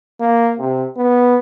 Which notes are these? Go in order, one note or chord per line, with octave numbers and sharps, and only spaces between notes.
A#3
C3
B3